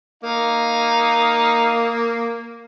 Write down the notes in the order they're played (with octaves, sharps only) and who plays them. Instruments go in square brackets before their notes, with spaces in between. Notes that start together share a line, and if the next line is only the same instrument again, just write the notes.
[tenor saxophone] A#3 [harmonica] D#4 F5